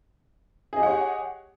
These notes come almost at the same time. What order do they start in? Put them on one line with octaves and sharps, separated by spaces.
G#4 D#5 G4 F#5 C#5